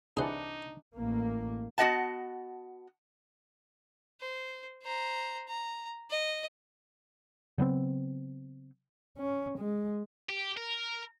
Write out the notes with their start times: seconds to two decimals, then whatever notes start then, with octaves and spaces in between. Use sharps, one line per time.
0.17 C2 E3 D4 D#4 G#4 C5 F#5
0.95 A1 A#3
1.78 B3 F#4 G4 D#5 F#5 A5
4.21 C5
4.83 C5 A#5
5.48 A#5
6.10 D#5
7.58 C#3 F#3 B3 C4
9.18 C#4
9.59 G#3
10.29 G4
10.57 A#4